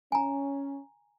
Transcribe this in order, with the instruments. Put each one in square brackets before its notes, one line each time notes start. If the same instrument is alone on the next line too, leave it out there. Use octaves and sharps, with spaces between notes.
[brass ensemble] C#4 [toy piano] G#5 A#5